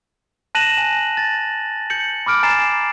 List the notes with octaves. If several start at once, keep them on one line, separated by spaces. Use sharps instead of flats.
A5 F#6 A#6 D#7 E7 F#7
G#5 F#7
A6
G6 C#7 F#7
B5 D6 F6 D7
G#5 A#5 A6 C7 E7